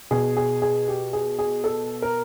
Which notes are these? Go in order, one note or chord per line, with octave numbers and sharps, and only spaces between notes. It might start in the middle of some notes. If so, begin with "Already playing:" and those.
B2 G#4
G#4
G#4
G4
G#4
G#4
A4
A#4